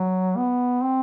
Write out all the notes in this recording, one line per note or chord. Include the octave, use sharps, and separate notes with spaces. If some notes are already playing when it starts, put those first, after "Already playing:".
Already playing: F#3
B3
C4